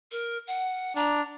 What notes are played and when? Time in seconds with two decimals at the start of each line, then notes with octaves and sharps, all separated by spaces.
0.11 A#4
0.47 F#5
0.96 D4 A#5